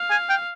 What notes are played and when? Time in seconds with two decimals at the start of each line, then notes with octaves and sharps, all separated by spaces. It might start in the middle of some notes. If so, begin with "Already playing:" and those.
Already playing: F5
0.11 G#5
0.29 G5